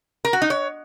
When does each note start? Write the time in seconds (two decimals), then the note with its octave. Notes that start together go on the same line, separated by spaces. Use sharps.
0.25 A#4
0.33 F#4
0.42 D#4
0.50 C#5